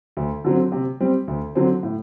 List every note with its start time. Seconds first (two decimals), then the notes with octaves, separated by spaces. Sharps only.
0.17 D2
0.45 D3 F#3 C4
0.72 C3
1.00 G3 C4
1.28 D2
1.55 D3 F#3 C4
1.83 A2